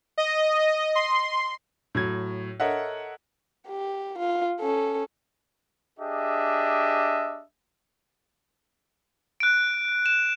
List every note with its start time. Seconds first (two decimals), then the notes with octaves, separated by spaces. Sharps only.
0.18 D#5
0.95 C6
1.95 A2 F#3 G#6
2.60 A4 A#4 C#5 D#5 E5 F#5
3.68 G4
4.19 F4
4.60 C#4 A4
5.99 D4 G4 G#4 D#5 E5
9.40 F#6 D7
10.06 E7